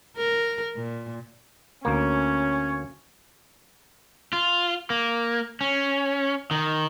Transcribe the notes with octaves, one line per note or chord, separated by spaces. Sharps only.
A#4
A#2
D2 A#3 C#4 C#5
F4
A#3
C#4
D#3